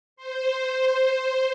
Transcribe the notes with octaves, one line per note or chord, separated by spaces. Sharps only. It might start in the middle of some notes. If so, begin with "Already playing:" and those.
C5